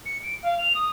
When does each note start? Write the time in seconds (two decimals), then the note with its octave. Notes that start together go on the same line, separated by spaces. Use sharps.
0.06 C#7
0.23 D7
0.43 F5
0.58 F7
0.75 D#6